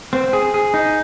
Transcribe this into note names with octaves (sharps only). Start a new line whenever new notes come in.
C4
G#4
G#4
D#4